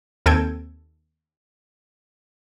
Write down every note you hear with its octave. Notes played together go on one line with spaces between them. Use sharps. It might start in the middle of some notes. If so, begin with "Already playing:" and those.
D#2 C4 A4 G6 G#6 D7